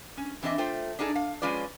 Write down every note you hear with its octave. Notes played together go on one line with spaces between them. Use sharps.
C#4
E3 C4 D4 A4 D#5 E5
A3 F4 C5 G5
D4 D#4 F#4 G#4 A4
F5
F3 G#3 C#4 F4 B4 D5